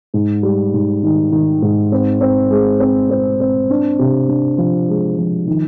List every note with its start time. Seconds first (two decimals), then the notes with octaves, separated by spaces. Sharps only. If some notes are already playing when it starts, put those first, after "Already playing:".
0.14 G#2
0.43 G3
0.74 G#2
1.03 D#3
1.32 D#3
1.62 G#2
1.92 C4
2.21 C4
2.50 G#3
2.80 C4
3.10 C4
3.40 C4
3.70 D4
3.99 C3
4.29 D4
4.58 F3
4.89 G#3
5.18 F3
5.47 D#3